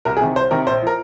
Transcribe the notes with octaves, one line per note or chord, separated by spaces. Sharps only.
C2 A#4
G#4
C3 D#3
C2 C5
C3 D#3 A#4
A#1 C5
F3 A#4